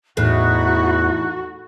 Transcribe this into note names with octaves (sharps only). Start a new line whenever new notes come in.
E2 A2 D#4 E4 F#4 F#6